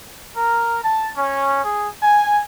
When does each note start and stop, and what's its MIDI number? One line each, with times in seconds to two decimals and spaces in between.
0.37 0.83 70
0.84 1.13 81
1.17 1.63 61
1.65 1.90 68
2.03 2.42 80